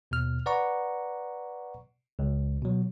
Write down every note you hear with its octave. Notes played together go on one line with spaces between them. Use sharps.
D#2 B2 F6
B4 D5 F#5 A#5 C#6
C#2
B2 F#3